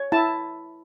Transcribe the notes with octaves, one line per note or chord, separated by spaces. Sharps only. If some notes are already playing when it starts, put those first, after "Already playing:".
Already playing: C#5
E4 A5